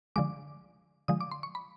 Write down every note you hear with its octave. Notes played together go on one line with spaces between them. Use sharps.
D3 F3 G#3 D6
D3 F3 G#3 D#6
D6
C6
C#6
B5